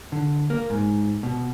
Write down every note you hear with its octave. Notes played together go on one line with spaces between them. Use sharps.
D3
A#3
G#2
B2